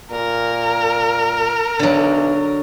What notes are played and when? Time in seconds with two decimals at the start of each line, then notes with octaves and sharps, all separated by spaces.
0.11 A#2 A#4
1.79 B1 D3 F#3